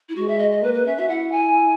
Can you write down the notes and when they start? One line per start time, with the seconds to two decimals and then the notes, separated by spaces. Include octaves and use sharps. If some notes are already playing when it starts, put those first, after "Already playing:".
0.09 E4
0.16 G#3 F#4
0.28 E5
0.39 D#5
0.51 D#5
0.62 A#3 B4
0.74 B4
0.86 C#4 E5
0.97 F#4 E5
1.09 E4 F#5
1.32 G#5